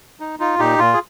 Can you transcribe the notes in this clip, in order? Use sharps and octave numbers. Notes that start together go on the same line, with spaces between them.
D#4
D#4 F4
A#2 D#4 G4
A#2 F4
G#4